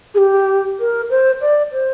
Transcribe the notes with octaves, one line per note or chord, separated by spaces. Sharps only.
G#4
G4
A#4
C5
D5
C5